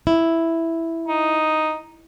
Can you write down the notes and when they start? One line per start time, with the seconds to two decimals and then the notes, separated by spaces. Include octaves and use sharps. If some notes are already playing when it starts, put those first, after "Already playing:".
0.07 E4
1.08 D#4